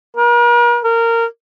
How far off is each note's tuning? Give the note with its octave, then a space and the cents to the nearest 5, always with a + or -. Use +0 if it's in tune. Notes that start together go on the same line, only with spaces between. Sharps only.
A#4 +45
A#4 -20